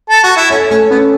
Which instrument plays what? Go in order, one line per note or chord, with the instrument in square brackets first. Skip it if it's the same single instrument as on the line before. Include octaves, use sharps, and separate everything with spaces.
[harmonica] A4
F#4
E4
[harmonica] C#4 [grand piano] A4
[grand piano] A3 [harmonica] C#4
[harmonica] B3 [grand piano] C#4